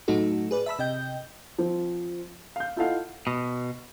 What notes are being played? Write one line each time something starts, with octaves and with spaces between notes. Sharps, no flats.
A2 F#3 A3 D#4 F#4 A4
G#4 B4 D5
E5 A5 B5 E6
C3 D#5 G5 G6
F3 C4
F5 G6
E4 F4 A4 D#5 F5 F#5
B2